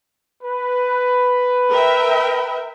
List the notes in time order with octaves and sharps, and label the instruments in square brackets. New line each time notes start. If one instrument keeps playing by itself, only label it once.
[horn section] B4
[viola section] A#4 E5 G5